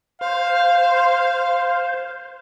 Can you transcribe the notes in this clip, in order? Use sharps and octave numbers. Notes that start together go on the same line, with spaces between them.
C5 F5